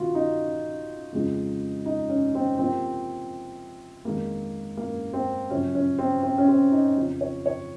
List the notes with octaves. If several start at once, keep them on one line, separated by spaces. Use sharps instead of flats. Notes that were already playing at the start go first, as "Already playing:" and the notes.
Already playing: C3 D#3 A#3 F4 F#4
D#4
F2 C#3 F3 G#3
D#4
C#4
C4
C3 F3 A#3 C4
F2 D#3 G#3 A#3
A#3
C4
F#2 C#3 F3 C#4
C#4
C4
C4
C#4
C4
D#4
F2 C#3 F3
C#5
C#5